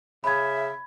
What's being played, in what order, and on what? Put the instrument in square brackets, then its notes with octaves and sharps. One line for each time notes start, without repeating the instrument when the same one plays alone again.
[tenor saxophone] C#3 [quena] E5 [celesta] B5 G#6